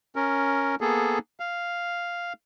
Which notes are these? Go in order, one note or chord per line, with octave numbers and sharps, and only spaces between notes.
C#4 A#4
A#3 B3 G#4 A4
F5